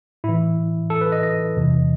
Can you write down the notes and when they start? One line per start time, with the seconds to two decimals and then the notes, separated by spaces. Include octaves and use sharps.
0.24 A2 E3 E4
0.90 A4
1.01 B4
1.12 D#5
1.23 D#5
1.56 E2 C3 E3